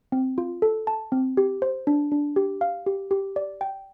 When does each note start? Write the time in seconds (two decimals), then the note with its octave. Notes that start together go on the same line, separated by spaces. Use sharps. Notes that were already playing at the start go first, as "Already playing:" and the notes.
0.12 C4
0.38 F4
0.62 A4
0.87 A5
1.12 C4
1.37 G4
1.62 C5
1.87 D4
2.12 D4
2.36 G4
2.61 F5
2.86 G4
3.11 G4
3.36 D5
3.61 G5